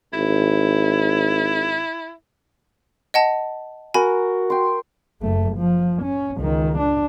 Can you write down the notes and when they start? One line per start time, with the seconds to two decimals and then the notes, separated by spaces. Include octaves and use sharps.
0.13 G#1 E4
3.14 D#5 F#5 A5
3.94 F#4 A#4 G#5 B5
4.50 G5 C6
5.21 F#1 A3
5.57 F3
6.03 C#4
6.38 C#2 D#3
6.78 D4